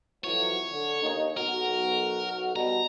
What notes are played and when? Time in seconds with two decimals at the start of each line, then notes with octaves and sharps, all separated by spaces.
0.24 F2 E3 F#3 C#5
0.71 D3
1.02 D#2 D#4
1.37 B1 F#4 A#4
2.56 B2 G3 A#5